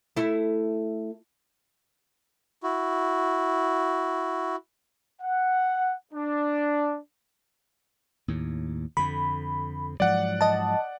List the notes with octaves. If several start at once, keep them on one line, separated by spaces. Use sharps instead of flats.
A3 E4
E4 F#4
F#5
D4
D#2 A2
F2 D3 B5
G#2 F3 F#3 D5 F#5
D#5 A5